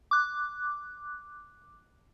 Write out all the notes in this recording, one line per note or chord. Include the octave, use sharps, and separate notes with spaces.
D6 F#6